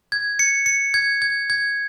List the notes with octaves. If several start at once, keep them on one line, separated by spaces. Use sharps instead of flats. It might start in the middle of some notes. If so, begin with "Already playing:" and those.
G#6
C#7
C#7
G#6
G#6
G#6